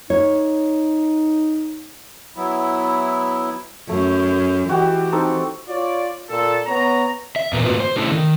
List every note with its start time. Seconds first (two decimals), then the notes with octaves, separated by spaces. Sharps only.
0.10 D#4 C#5
2.36 F#3 B3 E4
3.89 F#2 A3
4.69 E3 F#4 G4 D#5
5.12 C4 D#4 A4
5.69 F4 C#5 D5
6.30 A#2 A4
6.67 B3 C#5 A#5
7.36 E5
7.53 E2 A#2 B3 A#4
7.65 G#2 D3 A#3 F4 F#4 B4
7.80 C5
7.96 C3 A3 D4 E4 A4
8.12 D#3